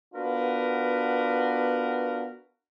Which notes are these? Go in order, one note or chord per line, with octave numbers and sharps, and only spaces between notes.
B3 D4 F4 F#4 A#4 B4